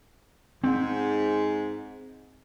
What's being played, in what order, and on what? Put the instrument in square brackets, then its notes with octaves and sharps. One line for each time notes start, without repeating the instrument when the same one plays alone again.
[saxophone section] G#2 [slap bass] C4